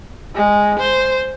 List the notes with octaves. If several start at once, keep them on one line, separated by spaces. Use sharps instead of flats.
G#3
C5